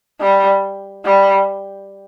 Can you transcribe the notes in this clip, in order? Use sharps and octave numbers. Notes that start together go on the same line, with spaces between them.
G3
G3